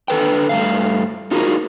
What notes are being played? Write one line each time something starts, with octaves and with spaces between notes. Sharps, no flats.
D3 A4 B4 G5
G2 F3 A3 F5
D#4 F4 F#4 G#4 A#4